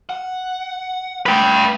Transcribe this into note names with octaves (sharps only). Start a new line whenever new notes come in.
F#5
G3 A3 B4 G5